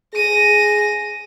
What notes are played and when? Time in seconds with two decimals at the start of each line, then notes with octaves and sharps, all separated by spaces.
0.14 G#4 A#6 D#7